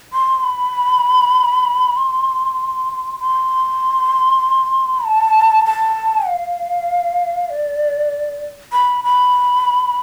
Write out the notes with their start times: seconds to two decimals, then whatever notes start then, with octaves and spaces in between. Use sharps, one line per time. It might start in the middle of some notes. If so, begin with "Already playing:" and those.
0.13 C6
0.43 B5
1.97 C6
3.20 C6
5.04 A5
5.66 A5
6.27 F5
7.50 D5
8.73 B5
9.04 B5